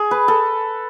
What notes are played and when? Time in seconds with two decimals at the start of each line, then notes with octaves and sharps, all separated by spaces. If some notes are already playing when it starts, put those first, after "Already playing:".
Already playing: G#4
0.11 B4
0.28 A4